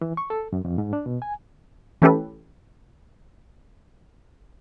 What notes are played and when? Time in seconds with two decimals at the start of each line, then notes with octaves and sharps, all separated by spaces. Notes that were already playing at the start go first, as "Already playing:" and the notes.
0.01 E3
0.17 C#6
0.30 A4
0.53 F#2
0.65 F2
0.78 G#2
0.93 D4
1.06 B2
1.22 G#5
2.02 E3 A3 C#4 G4 A4 B4